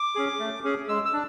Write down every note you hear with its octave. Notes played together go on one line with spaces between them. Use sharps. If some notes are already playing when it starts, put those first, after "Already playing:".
Already playing: D6
C#4 G#4
A3
C#4 G#4
G#3 E6
E6
D4